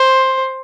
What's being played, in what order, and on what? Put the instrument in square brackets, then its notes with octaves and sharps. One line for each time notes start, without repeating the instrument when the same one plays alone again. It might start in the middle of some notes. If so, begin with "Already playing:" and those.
Already playing: [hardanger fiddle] C5